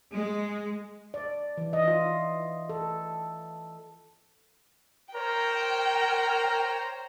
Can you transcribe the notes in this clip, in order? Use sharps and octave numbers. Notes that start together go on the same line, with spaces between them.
G#3
D5
E3
D#5
F4
A4
A#4 C5 C#5 G5 A#5